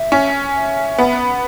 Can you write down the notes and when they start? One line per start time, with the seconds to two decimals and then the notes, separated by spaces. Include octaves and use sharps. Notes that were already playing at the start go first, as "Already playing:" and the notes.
Already playing: E5
0.12 C#4
0.55 E5
0.98 B3